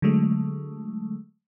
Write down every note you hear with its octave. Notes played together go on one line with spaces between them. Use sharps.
D3 F#3 G#3 A3